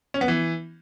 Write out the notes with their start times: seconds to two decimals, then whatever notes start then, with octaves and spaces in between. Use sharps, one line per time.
0.14 C#4
0.21 B3
0.28 E3